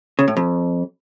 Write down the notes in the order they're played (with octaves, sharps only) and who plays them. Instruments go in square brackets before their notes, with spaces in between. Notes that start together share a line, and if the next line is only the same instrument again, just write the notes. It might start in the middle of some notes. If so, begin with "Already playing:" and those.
[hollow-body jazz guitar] C#3
A2
F2